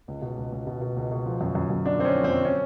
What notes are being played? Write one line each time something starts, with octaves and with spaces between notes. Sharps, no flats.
C#2
B2
C#2
C#2
B2
B2
C#2
B2
F3
F#2
F#2
F#2
D3 D4
F#2 C4
C#4
F3
C4
F#2
C#4